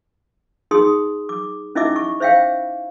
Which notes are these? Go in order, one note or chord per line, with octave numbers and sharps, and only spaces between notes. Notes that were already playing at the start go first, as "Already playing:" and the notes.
D#4 G#4 C6 D#6
D6
C#4 D#4 E4 D#5 E5 D6
C#6
C5 C#5 E5 F5 G5